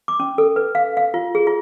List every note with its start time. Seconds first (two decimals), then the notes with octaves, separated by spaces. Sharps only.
0.08 D6
0.20 C#4
0.38 A4
0.56 B4
0.75 F5
0.97 F5
1.14 F4
1.35 G#4
1.47 F4